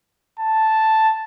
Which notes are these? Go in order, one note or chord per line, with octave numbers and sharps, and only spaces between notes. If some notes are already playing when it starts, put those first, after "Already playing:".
A5